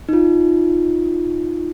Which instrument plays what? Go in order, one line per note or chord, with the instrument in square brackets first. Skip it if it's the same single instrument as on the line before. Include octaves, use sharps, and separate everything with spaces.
[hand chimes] D#4 F4